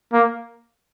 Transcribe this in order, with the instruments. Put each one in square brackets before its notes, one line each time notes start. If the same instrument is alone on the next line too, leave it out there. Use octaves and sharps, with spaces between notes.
[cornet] A#3